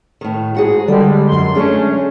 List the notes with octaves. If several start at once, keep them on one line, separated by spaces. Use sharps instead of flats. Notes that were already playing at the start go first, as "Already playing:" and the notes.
A2 D#3
G#2 F#4 G#4
D3 G3 G#3 A4 D5
F#2 C6
G#3 A3 C#4 D4